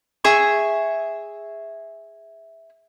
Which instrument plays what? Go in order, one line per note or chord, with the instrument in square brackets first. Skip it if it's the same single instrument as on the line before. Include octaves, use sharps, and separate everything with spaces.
[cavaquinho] G#4 E5 C#6